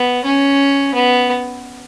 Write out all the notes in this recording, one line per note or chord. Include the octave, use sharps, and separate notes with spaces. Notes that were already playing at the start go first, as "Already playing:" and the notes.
Already playing: B3
C#4
B3